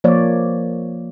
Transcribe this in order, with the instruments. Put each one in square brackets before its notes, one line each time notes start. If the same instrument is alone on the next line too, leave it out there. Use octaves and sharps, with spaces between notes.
[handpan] F3 A#3 C#5 D5